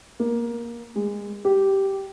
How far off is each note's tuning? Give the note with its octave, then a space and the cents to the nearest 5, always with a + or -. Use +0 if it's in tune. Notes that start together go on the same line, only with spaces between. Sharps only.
A#3 +15
G#3 -25
G4 -10